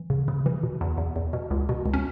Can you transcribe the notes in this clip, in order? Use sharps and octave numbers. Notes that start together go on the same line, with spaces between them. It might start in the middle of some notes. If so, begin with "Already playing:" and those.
Already playing: E3
C#3
C#3
E3
B2
E2
E2
E2
B2
C#2
B2
C#2
C#4